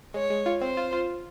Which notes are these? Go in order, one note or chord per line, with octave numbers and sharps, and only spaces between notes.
G#3 C#5
G#3
F4
C4 C5
F4
F4